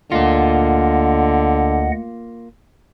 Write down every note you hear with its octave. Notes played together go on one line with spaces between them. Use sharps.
D2 D3 A#3 F4 D#5 F#5